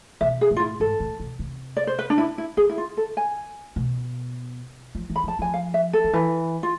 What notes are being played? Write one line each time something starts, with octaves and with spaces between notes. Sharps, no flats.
B2 E5
G#4
A2
F4
E4
G#2 A4
A2
B2
C3
D5
C5
B4
D4
E4
E4
D3 G#4
E4
F4
A4
G#5
B2
F3
E3
B5
F3 A5
F3 G#5
F5
E5
A4
D3
E3
F4